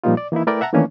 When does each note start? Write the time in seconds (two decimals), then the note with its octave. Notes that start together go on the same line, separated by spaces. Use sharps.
0.04 A#2 F3 G3 A#3 D#4 F4
0.17 D5
0.32 E3 A#3 D#4 E4
0.47 A3 E4 A#4 B4 D5 G5
0.61 E5 F#5 A5 A#5
0.73 D#3 E3 A3 A#3 C#4 D4